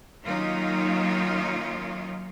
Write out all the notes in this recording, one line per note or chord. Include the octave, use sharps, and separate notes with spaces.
D#3 F#3 A#3 C#4 D#4 F4